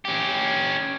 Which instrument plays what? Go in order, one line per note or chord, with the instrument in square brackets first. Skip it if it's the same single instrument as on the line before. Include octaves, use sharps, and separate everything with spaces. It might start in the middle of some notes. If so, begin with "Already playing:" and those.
[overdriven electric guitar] C#4 G4